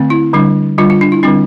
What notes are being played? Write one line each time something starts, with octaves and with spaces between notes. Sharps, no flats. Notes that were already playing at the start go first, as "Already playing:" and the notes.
Already playing: D3 A3 C4
E4
D3 G3 D4
D3 G3 D4 F4
F4
D4
E4
D3 G3 C4 D4